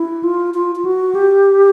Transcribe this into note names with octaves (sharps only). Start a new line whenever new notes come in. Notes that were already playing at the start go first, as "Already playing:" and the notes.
Already playing: E4
F4
F4
F4
F#4
G4